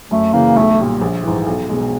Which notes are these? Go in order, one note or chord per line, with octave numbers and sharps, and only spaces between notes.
F#2 A3
C#3 E3 A#3
B1 A3
A#2 G3
A#1
G#2 E3
B1
B2 G#3